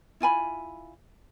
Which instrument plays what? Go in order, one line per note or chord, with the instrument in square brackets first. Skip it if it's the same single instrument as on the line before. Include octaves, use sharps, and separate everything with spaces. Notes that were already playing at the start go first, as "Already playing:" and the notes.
[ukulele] E4 F4 G#5 B5